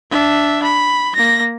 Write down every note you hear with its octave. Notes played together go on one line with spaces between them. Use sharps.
D4 E5
B5
A#3 A#6